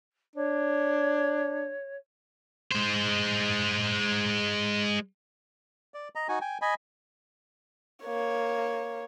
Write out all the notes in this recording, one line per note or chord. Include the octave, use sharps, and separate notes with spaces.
D4 C#5
G#3 C5
D5
D#5 A#5
D#4 F#4 G#5
G5 G#5
D#5 G#5 B5
A#3 C#5